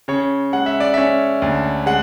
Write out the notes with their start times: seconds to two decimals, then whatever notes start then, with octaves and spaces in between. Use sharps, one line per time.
0.08 C#3 C#5
0.53 G#3 F#5
0.66 E5
0.80 D5
0.94 C#4 E5
1.42 D2
1.86 G#3 F#5